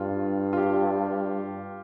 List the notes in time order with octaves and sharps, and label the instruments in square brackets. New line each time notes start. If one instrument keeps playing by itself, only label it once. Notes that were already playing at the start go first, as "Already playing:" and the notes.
Already playing: [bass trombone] G2 [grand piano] F4
[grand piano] F4
G4